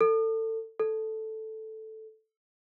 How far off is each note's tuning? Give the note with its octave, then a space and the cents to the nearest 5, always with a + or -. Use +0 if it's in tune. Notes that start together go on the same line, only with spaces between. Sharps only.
A4 +25
A4 -5